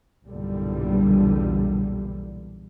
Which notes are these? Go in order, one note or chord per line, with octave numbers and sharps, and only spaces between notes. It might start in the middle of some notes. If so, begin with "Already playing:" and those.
B1 E2 G2 A#2 D3 G3